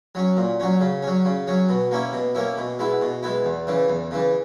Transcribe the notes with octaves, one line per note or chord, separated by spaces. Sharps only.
F#3 C#4
A#2
F#3 C#4
C#3
F#3 C#4
C#3
F#3 C#4
B2
A#3 C#4 E4
B2
A#3 C#4 E4
B2
G#3 B3 E4
B2
G#3 B3 E4
E2
C#3 E3
E2
C#3 E3